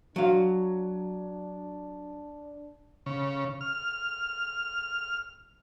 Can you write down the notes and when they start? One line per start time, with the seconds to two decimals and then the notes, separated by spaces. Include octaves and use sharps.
0.16 F#3 D4 F5
3.06 C#3
3.61 F6